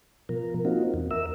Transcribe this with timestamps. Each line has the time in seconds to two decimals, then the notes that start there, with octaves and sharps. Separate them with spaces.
0.29 B2 F3 A#4
0.65 A#3 C4 D#4 F4 F#4
0.94 E2
1.11 A#4 E5 E6